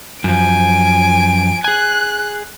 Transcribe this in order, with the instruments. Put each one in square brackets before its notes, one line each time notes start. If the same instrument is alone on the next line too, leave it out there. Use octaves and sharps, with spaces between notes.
[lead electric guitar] F#2 F3 [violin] G#5 D7
[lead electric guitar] G#4 G#5 [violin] F#6